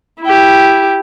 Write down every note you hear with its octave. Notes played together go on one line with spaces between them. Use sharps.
E4 G4